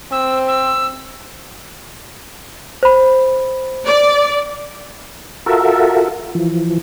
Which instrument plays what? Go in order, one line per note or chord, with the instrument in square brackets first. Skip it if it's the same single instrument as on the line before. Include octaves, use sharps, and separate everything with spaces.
[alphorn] C4 [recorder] E6
[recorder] E6
[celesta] C5 B5
[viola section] D5
[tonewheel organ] F4 F#4 A4 A#4 E5
E3 F3